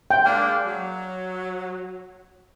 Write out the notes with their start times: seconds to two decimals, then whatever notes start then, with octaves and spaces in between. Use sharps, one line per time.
0.11 G5
0.26 G#3 A#3 D4
0.65 F#3